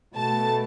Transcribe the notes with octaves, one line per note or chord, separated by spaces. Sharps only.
B2 A3 A5